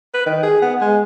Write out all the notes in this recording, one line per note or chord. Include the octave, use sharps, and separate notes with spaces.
B4
D#3
G#4
B3
G#3